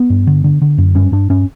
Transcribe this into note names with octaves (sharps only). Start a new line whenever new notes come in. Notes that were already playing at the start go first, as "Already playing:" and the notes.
Already playing: B3
G2
D3
D3
D3
F#2
G2 C#4
G2 D4
G2 C#4